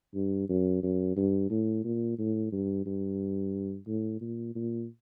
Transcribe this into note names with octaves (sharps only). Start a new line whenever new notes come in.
G2
F#2
F#2
G2
A2
A#2
A2
G2
G2
A2
A#2
A#2